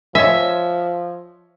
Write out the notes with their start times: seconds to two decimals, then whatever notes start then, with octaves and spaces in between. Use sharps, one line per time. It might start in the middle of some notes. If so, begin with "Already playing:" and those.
0.15 F3 C#5 D#5 E5 G#5